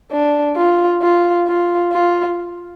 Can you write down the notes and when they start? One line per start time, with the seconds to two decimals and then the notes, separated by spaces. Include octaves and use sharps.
0.11 D4
0.56 F4
1.02 F4
1.48 F4
1.93 F4